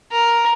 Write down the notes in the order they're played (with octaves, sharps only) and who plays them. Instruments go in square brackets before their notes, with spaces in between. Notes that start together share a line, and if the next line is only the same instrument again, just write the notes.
[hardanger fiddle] A#4